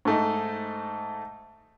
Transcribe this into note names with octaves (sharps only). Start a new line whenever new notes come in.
G#2 A3 D#4